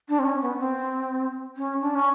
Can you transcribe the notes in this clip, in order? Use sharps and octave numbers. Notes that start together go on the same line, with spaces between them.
D4
C4
C#4
B3
C4
C#4
D4
C#4